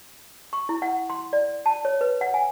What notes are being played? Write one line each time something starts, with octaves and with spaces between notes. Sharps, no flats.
C#6
E4
F#5
C6
D5
A5
C#5
B4
F#5
G#5